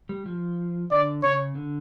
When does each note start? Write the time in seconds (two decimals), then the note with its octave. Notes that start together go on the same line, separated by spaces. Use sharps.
0.09 G3
0.26 F3
0.91 D3 D5
1.23 C#3 C#5
1.55 D3